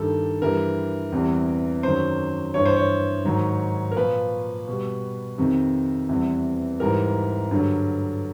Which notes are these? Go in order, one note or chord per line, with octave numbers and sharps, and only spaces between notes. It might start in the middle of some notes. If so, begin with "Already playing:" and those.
Already playing: G2 D#3 G3 A4
G2 E3 G3 A#4
E2 C3 E3 G3
F#2 D#3 F#3 C5
G2 E3 G3 C#5
C5
C#5
G#2 D#3 F#3
A#4
A#2 F3 B4
B2 G3
F2 C3 D#3
E2 C3 E3 G3
G#2 E3 G3 A#4
G2 D3 F#3